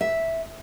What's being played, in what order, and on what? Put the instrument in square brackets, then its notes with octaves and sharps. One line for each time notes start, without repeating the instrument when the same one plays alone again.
[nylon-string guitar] E5